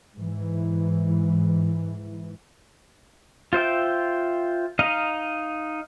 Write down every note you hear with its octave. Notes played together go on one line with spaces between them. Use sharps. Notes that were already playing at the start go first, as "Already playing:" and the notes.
G#2 E3
F4 C5 E5 G5
D#4 D#5 F5 A#5